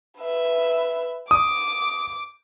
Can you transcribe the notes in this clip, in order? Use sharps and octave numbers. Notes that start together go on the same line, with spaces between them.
B4 E5
D6 D#6